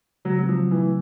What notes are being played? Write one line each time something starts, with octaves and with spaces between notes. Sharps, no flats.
C#3 F#3
F#3 C4
F3
F#3
E3
A3